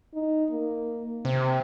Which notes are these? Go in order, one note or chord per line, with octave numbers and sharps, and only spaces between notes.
D#4
A#3
C3 C4